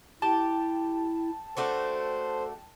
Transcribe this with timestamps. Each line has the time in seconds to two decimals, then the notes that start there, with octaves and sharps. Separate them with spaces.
0.22 E4 G4 G5 A5
1.57 A3 D4 F#4 A4 C5